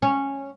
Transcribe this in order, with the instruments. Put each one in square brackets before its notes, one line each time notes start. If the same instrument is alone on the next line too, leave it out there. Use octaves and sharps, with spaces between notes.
[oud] C#4